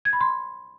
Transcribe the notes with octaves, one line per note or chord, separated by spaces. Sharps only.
G#6
B5
C6